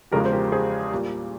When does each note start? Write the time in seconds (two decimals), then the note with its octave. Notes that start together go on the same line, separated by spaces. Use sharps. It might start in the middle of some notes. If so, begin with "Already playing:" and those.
0.11 E2 C#3 F3 G#3 G4 A#4
0.25 C5
0.32 G4 A#4
0.52 G#4 C5
0.91 A#2 G3